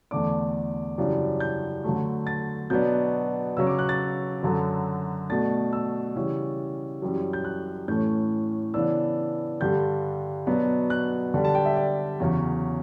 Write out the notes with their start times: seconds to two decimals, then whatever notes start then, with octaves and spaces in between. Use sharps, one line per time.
0.11 E2 D3 A3 D4 D6
0.98 F#2 C#3 E3 G3 D4
1.40 G6
1.84 D3 F#3 A3
2.27 A6
2.70 B2 F#3 B3 D4 G6
3.57 C#3 F#3 C#4 E6
3.67 D6
3.79 F#6
3.89 A6
4.43 F#2 D3 F#3
5.29 B2 A3 D4 A6
5.73 E6
6.15 C#3 E3 G3 C#4
7.02 F#2 E3 G3 C#4
7.33 G6
7.44 F#6
7.88 A2 E3 A3 C#4 G6
8.74 C#3 E3 B3 D4 E6
9.60 G2 D3 G3 G6
10.47 B2 F#3 B3 D4
10.90 F#6
11.34 D3 G3 D4
11.44 A5
11.55 G5
11.65 E5
11.77 D5
12.20 E2 C#3 F#3 C#4